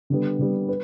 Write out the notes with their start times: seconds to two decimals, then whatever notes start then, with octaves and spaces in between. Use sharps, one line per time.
0.10 D3 G3 B3
0.39 D3 G3 B3
0.69 B4